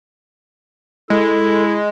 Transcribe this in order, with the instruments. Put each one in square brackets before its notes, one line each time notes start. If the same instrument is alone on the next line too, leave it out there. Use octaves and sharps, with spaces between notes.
[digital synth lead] G#3 [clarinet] E4 [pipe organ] A4